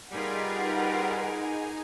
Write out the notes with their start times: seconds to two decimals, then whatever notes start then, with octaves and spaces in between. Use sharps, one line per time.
0.11 G3 D#4 F4 G#4 A#4 B4 F#5 G#5